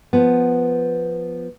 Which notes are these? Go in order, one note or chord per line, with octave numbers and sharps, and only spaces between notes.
F3 B3